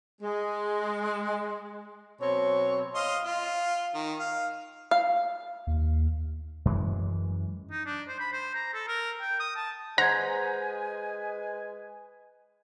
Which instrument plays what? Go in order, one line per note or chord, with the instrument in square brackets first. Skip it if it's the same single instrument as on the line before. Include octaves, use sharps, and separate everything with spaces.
[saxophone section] G#3
B2 F#3 C4 C#5
[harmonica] D#5 F5 C6
F4
D#3
F5
[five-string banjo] F5
[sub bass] D#2
[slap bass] F#2 E3 G#3
[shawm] D#4
D4
C5
B5
C5
A#5
A4
A#4
G5
D#6
A5
[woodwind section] G#3 B4 G#5 [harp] C5 G6 G#6 [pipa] F#5 [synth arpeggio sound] A#5